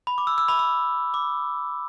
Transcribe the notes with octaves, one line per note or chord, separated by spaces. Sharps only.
B5
D6
E6
E6
B5
E6
D6